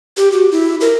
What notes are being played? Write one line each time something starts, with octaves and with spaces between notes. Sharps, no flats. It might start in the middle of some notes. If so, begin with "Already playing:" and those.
G4
F#4
E4
A#4